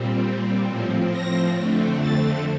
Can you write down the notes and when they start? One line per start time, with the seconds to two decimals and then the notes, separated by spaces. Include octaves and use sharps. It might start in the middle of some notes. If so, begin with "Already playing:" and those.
Already playing: A#2 G3 C4
0.68 A2 F3 C4
1.12 A#6
1.56 F2 D3 A3 C4
2.00 A6